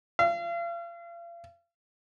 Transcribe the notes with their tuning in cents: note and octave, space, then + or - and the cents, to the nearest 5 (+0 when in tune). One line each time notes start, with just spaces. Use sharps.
F5 -40